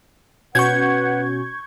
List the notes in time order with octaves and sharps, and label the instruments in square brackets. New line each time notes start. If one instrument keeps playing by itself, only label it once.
[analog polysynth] B2 C#4 F#4 [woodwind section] B4 F#5 [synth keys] C#6 G6 G#6